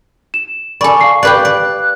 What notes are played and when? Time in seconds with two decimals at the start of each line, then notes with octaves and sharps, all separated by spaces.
0.34 E7
0.81 A4 D5 G#5 B5 C#6
1.01 F5 A5 C7
1.23 G4 B4 D5 F#6
1.45 D5